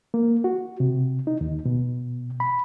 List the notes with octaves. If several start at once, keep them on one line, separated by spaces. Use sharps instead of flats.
A#3
F#4
C3
D#4
D#2
B2
B5